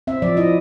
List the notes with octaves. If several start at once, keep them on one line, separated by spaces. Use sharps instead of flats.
C4 E5
F3 D5
E4 D#5